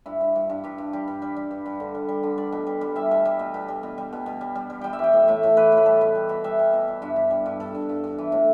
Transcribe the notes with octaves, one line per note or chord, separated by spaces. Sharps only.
G2 E4
G2
G2
G2
G2 G4
G2
G3 G4
G2
G3 B4
G3
G2
G2
D3
G3
G3
D3
G3 D5
B2
G3
G3
G3 E5
B2
G3
B2
B2
G3
B2
G3
B2
B2
G3
G3
G3
G3 G5
E5
E3 G5
A2
A2 E5
A2
E3 B4
A2
B4
G3 A4
B2
G3
B2
G3 E5
G3
B2
B2
G2 E5
G2
G3
G2
G2 A4
G2
G2
G2
E3
A2